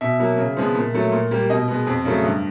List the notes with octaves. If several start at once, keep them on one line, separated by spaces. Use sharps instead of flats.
B2 E5
F#3 A#3
C#3
F3 G#3 B3
A#2
F#3 A3
A#2
G3 A#3
B2 D#5
G#3 B3
F2
C#3 F#3 A3
G2